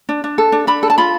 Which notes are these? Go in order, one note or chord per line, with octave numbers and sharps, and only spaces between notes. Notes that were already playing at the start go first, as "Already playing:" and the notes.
D4
D4
A4
D4
D4 B5
A4
A5
F4 B5